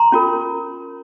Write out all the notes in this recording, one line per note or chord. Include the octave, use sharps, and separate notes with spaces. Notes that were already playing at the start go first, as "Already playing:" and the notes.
Already playing: A#5 C6
C#4 F4 A#4